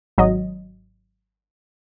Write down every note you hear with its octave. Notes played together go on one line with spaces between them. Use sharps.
G#1 F#3 D#5